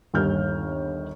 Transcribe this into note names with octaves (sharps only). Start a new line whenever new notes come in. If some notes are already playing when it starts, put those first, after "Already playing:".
G1 D#2 G3 F6 G6